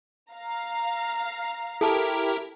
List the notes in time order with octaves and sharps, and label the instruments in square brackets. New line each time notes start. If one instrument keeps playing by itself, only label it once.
[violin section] F5 A#5
[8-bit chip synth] E4 G4 A#4 [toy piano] A4 A5